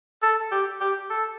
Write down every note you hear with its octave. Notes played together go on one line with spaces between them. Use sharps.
A4
G4
G4
A4